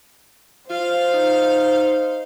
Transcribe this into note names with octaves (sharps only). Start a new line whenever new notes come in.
F4 C5 F5
D#4